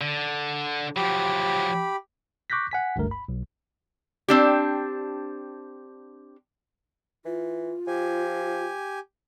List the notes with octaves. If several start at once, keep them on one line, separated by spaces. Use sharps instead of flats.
D3
F3 F#3 G4 B5
C#6 D6 F#6 G6 A#6 B6
F#5 G#5 B6
G1 C#2 G2 A3 A#4
B5
B1
C4 D4 G4
E3 F4
F3 G4 G#5